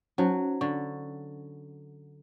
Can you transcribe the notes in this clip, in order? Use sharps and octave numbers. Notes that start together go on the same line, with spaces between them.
F#3 C#4 D#4 C5
D3 C#6